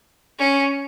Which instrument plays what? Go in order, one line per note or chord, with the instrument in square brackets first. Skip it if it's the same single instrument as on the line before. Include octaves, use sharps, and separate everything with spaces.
[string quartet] C#4